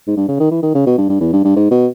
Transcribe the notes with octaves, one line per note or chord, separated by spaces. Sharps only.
G#2
G2
C#3
D#3
E3
D#3
C#3
B2
G2
G2
E2
G2
G2
G#2
B2